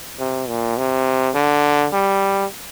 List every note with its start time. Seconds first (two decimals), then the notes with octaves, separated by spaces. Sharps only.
0.20 C3
0.48 A#2
0.78 C3
1.35 D3
1.93 G3